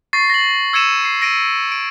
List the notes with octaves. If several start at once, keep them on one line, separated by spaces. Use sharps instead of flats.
C#6 A6 A#6 C7
A#6 F#7
E6 G#6 C#7 D#7 E7
C7
A#6 D7 D#7
D7